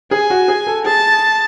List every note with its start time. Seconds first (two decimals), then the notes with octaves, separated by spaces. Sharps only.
0.11 G#4 G#5
0.30 F#4
0.48 G#4
0.67 A4
0.85 G#4 A5